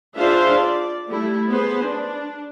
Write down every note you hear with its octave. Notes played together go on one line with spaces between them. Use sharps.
D4 F4 G#4 C5 E5 F5
D5
G3 A3 E4
B3 G#4 B4 C5
D4